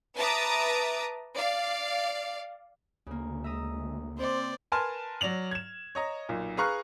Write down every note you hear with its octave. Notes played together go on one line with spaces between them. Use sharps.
B4 E5 A5 A#5 D6 D#6
D5 F5
D2 C#3 A#3
G#3 E5 A#5 D#6
C4 C5 D5
A#4 B4 G#5 A5 C6 F6
F#3 D5 F7 F#7
G#6 E7
C#5 D#5 A#5
B1 A#2
G#4 B4 F5 A#5 C#6 F#6